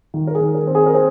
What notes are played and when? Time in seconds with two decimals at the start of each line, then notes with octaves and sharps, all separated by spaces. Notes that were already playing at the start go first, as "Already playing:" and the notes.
0.14 D#3
0.27 A#4
0.35 G#4
0.41 D#3
0.55 A#4
0.67 C4
0.75 G#4
0.86 A#4
0.94 C4